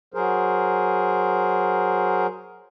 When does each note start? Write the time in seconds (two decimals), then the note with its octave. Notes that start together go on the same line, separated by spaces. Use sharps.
0.14 F#3 G#4 A#4 C5